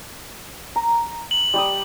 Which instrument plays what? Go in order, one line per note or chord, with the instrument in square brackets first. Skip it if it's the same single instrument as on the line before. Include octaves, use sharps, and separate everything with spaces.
[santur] A#5
[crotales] F#7
[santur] G3 G4 D#6